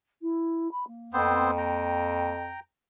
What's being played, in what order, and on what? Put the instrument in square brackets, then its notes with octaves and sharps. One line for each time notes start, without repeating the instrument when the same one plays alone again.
[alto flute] E4
B5
A#3
[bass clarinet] F2 [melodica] B3 C4 C5
[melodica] G5 A#5